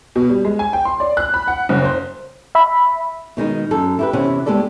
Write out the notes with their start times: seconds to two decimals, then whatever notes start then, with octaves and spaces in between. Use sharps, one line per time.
0.16 B2
0.29 G3
0.45 G#3
0.59 G#5
0.73 G5
0.85 C6
1.00 D5
1.17 F#6
1.34 B5
1.47 F#5
1.69 F#1
1.84 C5
2.55 E5 B5
3.37 B2 D#3 G#3 D#4
3.71 F#2 A4
3.99 E4 G4 B4
4.13 E2 C3 C#4 E4 F#5
4.46 G2 G#3 B3 G4 A4 D5